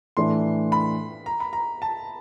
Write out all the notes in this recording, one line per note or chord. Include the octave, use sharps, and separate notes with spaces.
A2 E3 A3 D4 C6
B5
A#5
B5
A#5
A5